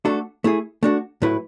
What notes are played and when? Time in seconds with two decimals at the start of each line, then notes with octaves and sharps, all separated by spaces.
0.05 A3 D4 F#4 A4
0.44 A3 E4 G#4
0.83 A3 D4 F#4
1.22 A2 F#3 A3 E4 B4